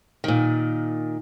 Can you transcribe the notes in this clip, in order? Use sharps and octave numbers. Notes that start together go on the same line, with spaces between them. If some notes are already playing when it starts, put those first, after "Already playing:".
A#2 D#3